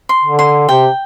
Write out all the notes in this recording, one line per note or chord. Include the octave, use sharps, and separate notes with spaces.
C6
D3
C6
C3 G5